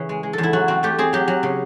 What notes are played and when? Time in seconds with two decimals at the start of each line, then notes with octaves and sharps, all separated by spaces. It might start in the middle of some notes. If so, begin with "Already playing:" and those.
Already playing: C#3 E3
0.09 G#3
0.23 G#3
0.33 E2 A4
0.43 E4
0.53 F#3 F#4
0.68 C4 F#4
0.83 A3 G4
0.98 C4 G#4
1.13 F#3 G4
1.28 F#3
1.43 C#3